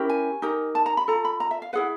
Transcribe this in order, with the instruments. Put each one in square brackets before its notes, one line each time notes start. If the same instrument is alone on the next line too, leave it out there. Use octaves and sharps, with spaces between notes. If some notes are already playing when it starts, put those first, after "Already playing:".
Already playing: [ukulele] C#4 E4 G4 A#4
G#5
D#4 G4 A#4
A5
A#5
B5
F4 A4 A#5
B5
A#5
E5
F5
E4 G#4 B4 F#5